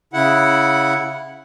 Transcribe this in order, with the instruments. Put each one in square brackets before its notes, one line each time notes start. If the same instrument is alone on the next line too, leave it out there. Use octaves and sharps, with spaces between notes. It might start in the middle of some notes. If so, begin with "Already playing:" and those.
[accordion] C#3 E4 F#5